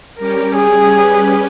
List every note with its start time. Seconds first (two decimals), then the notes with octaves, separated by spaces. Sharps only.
0.19 G3 C#4 G4 A#4
0.56 G#4
0.93 G3 C#4 G4 B4